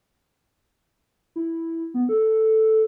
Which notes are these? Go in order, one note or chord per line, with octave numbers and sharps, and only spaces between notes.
E4
B3
A4